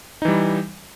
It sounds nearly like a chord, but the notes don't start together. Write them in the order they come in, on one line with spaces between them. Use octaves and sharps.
D#4 E3 G3